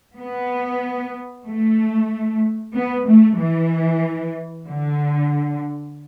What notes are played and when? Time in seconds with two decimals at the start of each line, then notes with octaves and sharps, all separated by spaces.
0.19 B3
1.46 A3
2.74 B3
3.07 A3
3.38 E3
4.67 D3